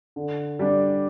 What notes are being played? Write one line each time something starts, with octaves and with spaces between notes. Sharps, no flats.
D3
G3 D4